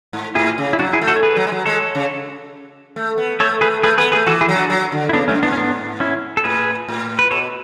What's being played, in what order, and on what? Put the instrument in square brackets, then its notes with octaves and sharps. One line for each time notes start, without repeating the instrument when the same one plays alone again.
[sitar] G#2
[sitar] A2 [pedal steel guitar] E4 G#4
[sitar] C#3
[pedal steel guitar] E4
[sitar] F#3 [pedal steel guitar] D4 F#4
[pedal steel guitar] E4 G#4
[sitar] A3
[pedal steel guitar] F#4 A4
C#5
G#4 B4
[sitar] F#3
G#3
F#3
[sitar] G#3 [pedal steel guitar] A4 C#5
[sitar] C#3
A3
B3
[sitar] A3 [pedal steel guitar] A4 C#5
[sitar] A3 [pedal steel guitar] G#4 B4
[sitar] A3 [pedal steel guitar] G#4 B4
[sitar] B3 [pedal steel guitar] G#4 B4
[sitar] A3 [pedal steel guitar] G#4 B4
[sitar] E3 [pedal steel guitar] F#4 A4
[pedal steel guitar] E4 G#4
[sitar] F#3
[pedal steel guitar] D4 F#4
[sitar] F#3
D3
[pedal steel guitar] E4
[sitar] C#3 [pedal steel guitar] B3 D4
[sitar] F#2 [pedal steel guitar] A3 C#4
[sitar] G#2 [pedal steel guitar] B3 D4
[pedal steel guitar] C#4
B3 D4
C#4 E4
A4
[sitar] A2 [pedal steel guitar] G#4 B4
[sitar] A2
[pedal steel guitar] B4
[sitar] B2 [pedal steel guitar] A4 C#5